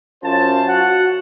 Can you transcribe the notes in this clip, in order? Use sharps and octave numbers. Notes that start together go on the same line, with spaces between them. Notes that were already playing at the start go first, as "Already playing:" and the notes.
F#2 C#4 F4 C5 A5
F#4 F#5